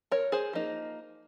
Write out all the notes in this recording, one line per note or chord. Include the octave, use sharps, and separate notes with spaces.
A#4 C#5
G#4 C5
F3 A#3 D#4